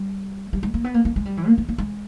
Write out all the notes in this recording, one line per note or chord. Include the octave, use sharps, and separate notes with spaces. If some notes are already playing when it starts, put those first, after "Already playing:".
Already playing: G3
G3
G#3
A#3
B3
A#3
A#3
G#3
G3
E3
A#3
A#3
A#3
G#3